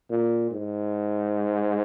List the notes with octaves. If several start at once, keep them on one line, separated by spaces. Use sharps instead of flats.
A#2
G#2